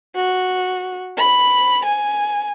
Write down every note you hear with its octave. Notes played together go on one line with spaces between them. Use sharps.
F#4
B5
G#5